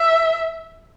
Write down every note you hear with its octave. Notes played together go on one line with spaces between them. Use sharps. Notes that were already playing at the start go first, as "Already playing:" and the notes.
Already playing: E5